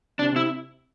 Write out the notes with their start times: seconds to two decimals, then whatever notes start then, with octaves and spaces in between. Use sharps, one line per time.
0.19 C3 D4
0.32 C3 E4